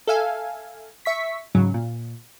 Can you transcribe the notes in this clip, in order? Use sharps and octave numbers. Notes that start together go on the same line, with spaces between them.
A4 E5 F5 G#5
E5 C#6 B6
G#2 C#3 F#3
A#2